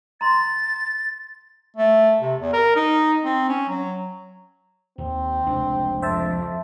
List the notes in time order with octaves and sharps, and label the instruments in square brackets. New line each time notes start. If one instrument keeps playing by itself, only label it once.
[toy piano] A#5 C6 [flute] A6
[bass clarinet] A3
C3
E2
A#4
D#4
C4
C#4
F#3
[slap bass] D#2 [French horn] C4
[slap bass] F1 C#2 D4
[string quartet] F2 [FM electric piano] C5 E5 A5